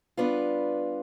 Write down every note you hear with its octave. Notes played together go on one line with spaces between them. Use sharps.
G3 B3 D4 F4 B4